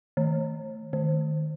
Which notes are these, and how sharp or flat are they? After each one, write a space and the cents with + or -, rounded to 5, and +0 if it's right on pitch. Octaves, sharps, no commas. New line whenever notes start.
D#3 +30
D#3 -15